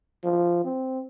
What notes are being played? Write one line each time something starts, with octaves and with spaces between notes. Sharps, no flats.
F3
C4